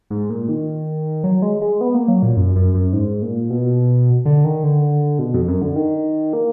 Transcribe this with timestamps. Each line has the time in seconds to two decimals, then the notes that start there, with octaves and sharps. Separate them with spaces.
0.10 G#2
0.30 A#2
0.49 D#3
1.24 F#3
1.42 G#3
1.62 G#3
1.81 B3
1.95 A#3
2.08 F#3
2.23 A#2
2.37 F#2
2.56 F#2
2.75 F#2
2.93 G#2
3.22 A#2
3.50 B2
4.25 D3
4.44 D#3
4.64 D3
5.19 B2
5.34 F2
5.48 F#2
5.62 D3
5.76 D#3
6.33 A#3